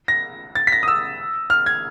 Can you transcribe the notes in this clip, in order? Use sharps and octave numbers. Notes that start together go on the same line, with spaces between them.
A#6
A6
B6
A#6
D#6
E6
F6
G#6